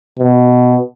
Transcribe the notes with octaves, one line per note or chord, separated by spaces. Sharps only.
B2